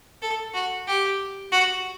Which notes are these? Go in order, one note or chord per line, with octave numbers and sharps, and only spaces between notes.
A4
F#4
G4
F#4